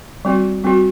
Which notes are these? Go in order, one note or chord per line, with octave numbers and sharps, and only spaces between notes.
G3 C4 F#4
G3 C4 F#4